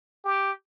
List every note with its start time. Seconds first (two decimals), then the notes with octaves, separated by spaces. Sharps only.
0.24 G4